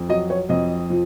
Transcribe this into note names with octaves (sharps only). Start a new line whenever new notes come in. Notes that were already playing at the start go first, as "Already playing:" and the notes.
Already playing: F2
F#3 D#5
C#5
F2 D#5
F3